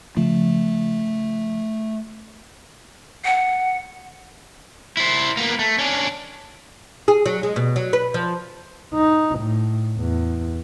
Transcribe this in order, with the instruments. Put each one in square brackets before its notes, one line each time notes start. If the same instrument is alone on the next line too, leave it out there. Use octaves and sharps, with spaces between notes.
[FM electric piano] C#3 F3 [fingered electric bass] A3
[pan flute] F#5
[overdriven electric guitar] E4 C5
A#3 B3
A3
C#4 D4
[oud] G#4
F#3
G#3
B2
F#3
B4
F3
[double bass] D#4
A2
E2